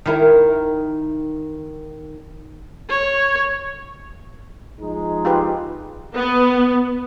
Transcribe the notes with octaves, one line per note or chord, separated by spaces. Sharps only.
D#3 E4 A#4
C#5
F3 G#3 D#4
F4 G4 B4
B3